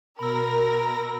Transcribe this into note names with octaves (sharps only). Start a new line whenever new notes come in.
B2 A#4 B5 E6 A#6